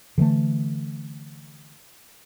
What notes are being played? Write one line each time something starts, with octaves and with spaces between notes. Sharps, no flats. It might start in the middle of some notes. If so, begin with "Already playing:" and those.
D3 E3 G#3 A3